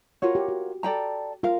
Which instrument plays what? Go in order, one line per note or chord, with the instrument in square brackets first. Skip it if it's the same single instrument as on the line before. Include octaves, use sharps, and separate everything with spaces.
[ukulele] F4 A#4 C#5 F#5 [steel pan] F#4
[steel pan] G4
F#4
[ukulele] A4 D5 G5 A#5
[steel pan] F4 [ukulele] A#4 F5